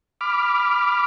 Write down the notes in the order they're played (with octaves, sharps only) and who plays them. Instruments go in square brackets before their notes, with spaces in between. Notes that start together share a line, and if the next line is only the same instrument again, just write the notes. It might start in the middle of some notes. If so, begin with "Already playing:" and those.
[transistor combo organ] B5 D6 F6